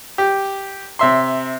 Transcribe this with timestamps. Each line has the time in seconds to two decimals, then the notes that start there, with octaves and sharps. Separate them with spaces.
0.18 G4
0.99 C3 E5 C6